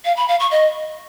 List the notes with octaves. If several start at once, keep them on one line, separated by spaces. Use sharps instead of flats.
F5
B5
F5
C#6
D#5